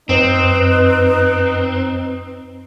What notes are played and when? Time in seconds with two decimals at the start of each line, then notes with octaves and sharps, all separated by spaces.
0.09 F#2 C4 D#4 B4 C5